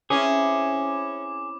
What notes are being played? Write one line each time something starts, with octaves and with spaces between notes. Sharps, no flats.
C4 C#4 E4 G#4 B4 D6